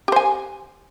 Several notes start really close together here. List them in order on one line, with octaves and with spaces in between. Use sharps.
G4 C5 G#5